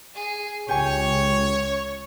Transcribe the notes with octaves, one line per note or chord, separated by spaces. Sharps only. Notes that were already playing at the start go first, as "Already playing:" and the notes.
G#4
C#2 C#3 G4 C#5 G#5 C#6